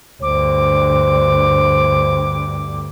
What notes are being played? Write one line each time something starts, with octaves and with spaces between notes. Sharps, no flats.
D2 G2 C5 D6